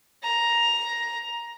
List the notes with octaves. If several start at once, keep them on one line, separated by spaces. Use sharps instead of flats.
A#5